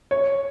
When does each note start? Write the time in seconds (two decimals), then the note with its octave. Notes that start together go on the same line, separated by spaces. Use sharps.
0.11 C#5